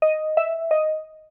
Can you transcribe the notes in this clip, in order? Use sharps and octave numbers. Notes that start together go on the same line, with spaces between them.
D#5
E5
D#5